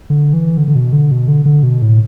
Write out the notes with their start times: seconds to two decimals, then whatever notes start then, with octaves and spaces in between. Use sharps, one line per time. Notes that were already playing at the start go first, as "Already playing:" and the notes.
0.10 D3
0.33 E3
0.57 D3
0.68 D3
0.76 B2
0.93 D3
1.11 B2
1.28 D3
1.46 D3
1.63 B2
1.82 A2